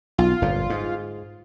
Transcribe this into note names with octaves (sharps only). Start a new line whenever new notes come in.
B1 F4
G1 F2 A#2
G#2